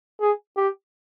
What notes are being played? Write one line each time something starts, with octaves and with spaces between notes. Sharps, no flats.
G#4
G4